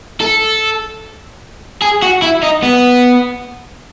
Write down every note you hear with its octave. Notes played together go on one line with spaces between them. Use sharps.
A4
G#4
F#4
E4
D#4
B3